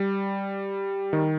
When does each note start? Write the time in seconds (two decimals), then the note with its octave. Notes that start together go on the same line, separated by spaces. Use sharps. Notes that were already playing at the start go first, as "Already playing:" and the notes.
Already playing: G3
1.13 D#3